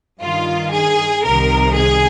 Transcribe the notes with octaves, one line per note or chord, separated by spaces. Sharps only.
G2 D#3 F4
G#4
C2 C3 D#3 A#4
G#4